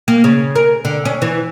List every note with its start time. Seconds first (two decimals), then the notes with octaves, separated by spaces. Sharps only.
0.08 A#3
0.24 C#3
0.55 A#4
0.85 D3
1.05 C#4
1.22 E3